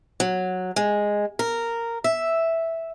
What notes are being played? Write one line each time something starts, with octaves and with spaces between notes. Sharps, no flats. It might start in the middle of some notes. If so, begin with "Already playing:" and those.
F#3
G#3
A#4
E5